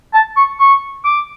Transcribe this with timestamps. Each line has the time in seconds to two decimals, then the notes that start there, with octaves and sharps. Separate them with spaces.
0.14 A5
0.36 C#6
0.60 C#6
1.05 D6